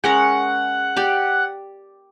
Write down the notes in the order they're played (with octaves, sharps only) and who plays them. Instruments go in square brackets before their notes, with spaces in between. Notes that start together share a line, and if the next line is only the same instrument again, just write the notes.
[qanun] G#3 C#4 A#4 [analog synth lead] F#5
[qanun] G4 D5